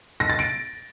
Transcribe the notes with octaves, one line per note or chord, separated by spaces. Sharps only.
A#6
A6
D7